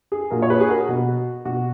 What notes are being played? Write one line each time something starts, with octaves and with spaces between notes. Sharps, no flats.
G#4
A#2 F#4 A#4
C#5
G#4 B4
G#4
F#4 A#4
B2 F#4
B2 F#4